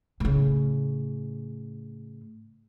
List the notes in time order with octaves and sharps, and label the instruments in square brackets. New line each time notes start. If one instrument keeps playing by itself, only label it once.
[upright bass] A2 C#3